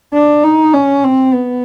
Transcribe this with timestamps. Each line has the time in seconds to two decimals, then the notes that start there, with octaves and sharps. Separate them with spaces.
0.14 D4
0.44 D#4
0.73 C#4
1.04 C4
1.34 B3